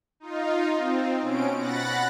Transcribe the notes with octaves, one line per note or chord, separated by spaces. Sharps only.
D#4 F4
C4
B2 C#4 D7
F#5 B5 F#6 A6 A#6